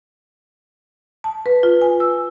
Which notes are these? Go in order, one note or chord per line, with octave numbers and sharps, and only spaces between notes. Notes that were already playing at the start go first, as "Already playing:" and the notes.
A5
B4
F4
G#5
E6